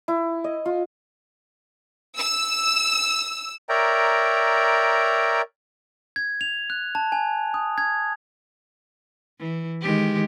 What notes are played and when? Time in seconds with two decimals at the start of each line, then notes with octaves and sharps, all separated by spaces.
0.08 E4
0.44 D#5
0.66 F4
2.17 E6
3.69 A#4 C#5 D5 E5 G5 A#5
6.16 G#6
6.41 F7
6.70 F#6
6.95 A5
7.12 G#5
7.54 D#6
7.78 G#6
9.39 E3
9.81 D#3 G#3 G4